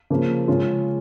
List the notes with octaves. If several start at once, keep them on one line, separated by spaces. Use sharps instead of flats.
C#3 F3 A#3
C#3 G#3 C#4 F4